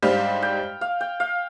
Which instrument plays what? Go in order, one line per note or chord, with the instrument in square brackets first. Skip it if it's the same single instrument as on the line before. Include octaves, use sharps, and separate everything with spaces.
[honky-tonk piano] G#2 G3 D4 G4 C5 [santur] F5
[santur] G5
F5
G5
F5